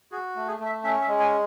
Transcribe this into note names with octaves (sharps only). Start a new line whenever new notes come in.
F#4 G#4
A3
G#4
A3
E5
C#4 E5
E5
G#3
G#5